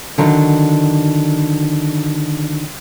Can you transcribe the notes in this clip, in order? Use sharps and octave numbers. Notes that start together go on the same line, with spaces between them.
D3 D#3 F#3